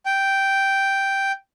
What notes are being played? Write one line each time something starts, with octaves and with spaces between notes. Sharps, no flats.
G5